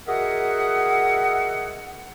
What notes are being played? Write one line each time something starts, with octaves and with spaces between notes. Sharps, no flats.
F#4 G#4 A#4 D#5 E5 F#5